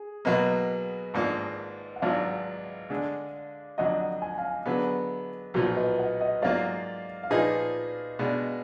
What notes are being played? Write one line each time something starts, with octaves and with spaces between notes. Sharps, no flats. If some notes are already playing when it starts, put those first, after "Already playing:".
Already playing: G#4
B2 F#3 A#3 B4 D#5
G#1 G#2 F3 A#3 D4
F#5
G#1 G#2 F#3 D4 F4 D5 F5
D3 G#3 D4 G#4
F2 D3 F#3 D#5 F#5
G#5
F5 G#5
D3 F#3 B3 G#4 B4
B1 A#2 F3 F#4 A#4
B4 D#5
D#5 F#5
D#5 F#5
G#2 F#3 A#3 F4 D5 F5
F5
A#2 F3 A#3 D#4 G#4 B4 D#5
B2 G#3 D4